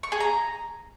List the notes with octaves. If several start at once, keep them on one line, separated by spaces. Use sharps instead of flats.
C#6
G#4
A#5